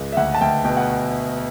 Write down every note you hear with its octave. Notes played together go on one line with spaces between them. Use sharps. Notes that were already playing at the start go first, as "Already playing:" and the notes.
Already playing: C#2
E5
D2 F#5
A5
D2 G5
B2 G5
F#5